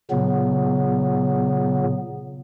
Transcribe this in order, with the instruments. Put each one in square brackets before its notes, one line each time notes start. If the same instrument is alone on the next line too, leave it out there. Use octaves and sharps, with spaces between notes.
[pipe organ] A#2 C#3 F#3 B3